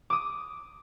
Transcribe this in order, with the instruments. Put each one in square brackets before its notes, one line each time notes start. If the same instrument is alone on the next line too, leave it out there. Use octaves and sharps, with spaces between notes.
[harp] D6 D#6